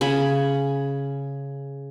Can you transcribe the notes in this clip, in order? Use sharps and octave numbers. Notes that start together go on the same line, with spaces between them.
C#3 G#5 B5